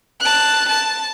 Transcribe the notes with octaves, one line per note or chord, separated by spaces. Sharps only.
A5 F#6
A5